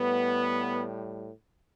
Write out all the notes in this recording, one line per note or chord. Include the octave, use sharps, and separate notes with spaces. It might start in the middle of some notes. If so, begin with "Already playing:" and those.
Already playing: A2 G3 B3